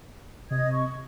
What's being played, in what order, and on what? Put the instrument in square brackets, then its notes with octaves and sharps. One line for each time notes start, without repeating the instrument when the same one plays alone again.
[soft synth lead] C3 [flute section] D#5 D#6 G#6
[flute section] C#6